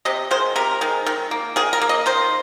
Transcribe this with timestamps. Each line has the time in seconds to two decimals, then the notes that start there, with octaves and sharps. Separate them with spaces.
0.05 C3 D#5
0.31 D#3 G#3 C5
0.56 C3 A#4
0.81 D#3 G#3
1.06 D#3
1.31 A#3
1.56 D#3 G#4
1.73 A#4
1.81 A#3
1.89 D#5
2.06 D#3 C5